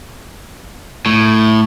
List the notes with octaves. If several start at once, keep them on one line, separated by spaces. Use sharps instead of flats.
A2